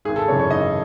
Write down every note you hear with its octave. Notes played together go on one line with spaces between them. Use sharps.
G#1 G#4
A4
F#2 C#3 E3 C#5
C#5
G#1 D#5